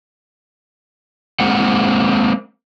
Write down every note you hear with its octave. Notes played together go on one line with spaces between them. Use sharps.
G#3 A#3 C4 F#5